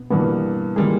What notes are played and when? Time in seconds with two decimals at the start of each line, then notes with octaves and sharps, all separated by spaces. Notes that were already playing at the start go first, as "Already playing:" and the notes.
Already playing: B2 B3
0.10 G2 B2 E3 A#3 B3
0.76 E3 G3 G#3 A#3 G#4